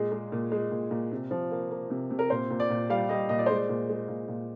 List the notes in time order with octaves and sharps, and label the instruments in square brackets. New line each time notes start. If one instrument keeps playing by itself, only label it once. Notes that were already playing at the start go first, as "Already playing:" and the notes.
Already playing: [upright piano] A#2 G#3 G#4
G#3
A#2
G#3
A#2
A#2
C3
F3
A#3
A#3
C3
C3
A#4
A#2 C5
A#2
D5
A#2
G3 F5
G3 D#5
A#2 D#5
D5
G#3 C5
D5
A#2
G#3
A#2
A#2